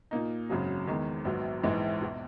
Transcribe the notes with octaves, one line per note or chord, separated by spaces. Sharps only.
A#2 A#3 D#4
G#1 F#2 C#3 F#3
E2 D#3 G#3
A#1 G#2 F#3 B3
A#1 G#2 E3 G#3 D#4
E2 B2